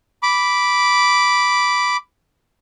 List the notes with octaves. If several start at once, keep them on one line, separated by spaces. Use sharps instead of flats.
B5 D6